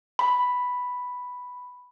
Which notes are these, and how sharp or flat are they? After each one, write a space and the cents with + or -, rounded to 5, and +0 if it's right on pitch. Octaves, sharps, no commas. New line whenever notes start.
B5 +0